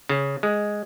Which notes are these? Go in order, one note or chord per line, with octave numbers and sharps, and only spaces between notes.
C#3
G#3